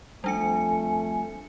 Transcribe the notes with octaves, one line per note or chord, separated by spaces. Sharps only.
F2 G3 A3 D4 G#5 C#7